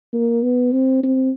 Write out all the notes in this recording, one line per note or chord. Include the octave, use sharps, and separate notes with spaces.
A#3
B3
C4
C4